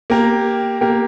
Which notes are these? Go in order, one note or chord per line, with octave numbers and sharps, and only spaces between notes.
A#3 G4 A#4
A#3 G4 A#4